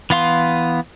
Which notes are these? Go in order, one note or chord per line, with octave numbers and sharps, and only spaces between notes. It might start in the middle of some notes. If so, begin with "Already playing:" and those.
E3 B3 F5 C6